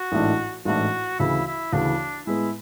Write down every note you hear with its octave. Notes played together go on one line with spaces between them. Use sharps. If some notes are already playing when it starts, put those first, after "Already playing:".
Already playing: F#4
A1 G#2 E3 A3 D4
A1 G#2 E3 A3 D4 F#4
D2 C#3 E3 E4
E4
D2 C#3 E3 D4
A2 G#3 B3 E4